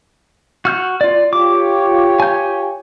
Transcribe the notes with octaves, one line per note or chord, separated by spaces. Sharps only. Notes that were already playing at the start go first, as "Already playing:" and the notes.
F#4 F6 G6
F4 D5
F4 G4 C#5 D6
G#5 G6